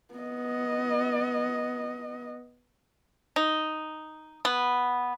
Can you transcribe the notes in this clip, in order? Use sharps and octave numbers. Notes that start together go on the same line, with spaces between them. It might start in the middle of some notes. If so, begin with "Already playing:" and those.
B3 D#5
D#4
B3